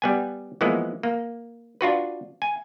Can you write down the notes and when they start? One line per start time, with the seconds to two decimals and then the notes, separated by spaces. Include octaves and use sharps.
0.02 G3 B3 G#5
0.61 E3 F3 G#3 A#3 B3
1.03 A#3
1.81 D4 F4 F#4 B4
2.42 G#5